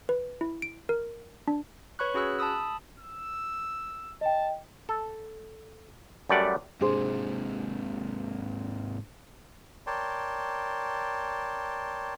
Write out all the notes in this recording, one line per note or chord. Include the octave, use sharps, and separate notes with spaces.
B4
E4
D7
A#4
D4
B4 C#5 B5 C#6 F#6
C#4 F#4 G#4 B5 E6 F#6
A5 B5 D#6 E6
E6
D#5 G5 A5
A4
F#2 G3 A3 D5 F#5
G#2 C3 D4 G#4 C5
A#4 C#5 D5 G5 A5 C6